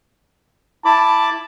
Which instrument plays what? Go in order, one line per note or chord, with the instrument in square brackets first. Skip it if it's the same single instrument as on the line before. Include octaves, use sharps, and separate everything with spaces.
[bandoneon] E4 B5 D6 [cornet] A5